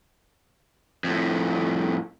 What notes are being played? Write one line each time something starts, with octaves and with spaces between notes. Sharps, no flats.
F2 A2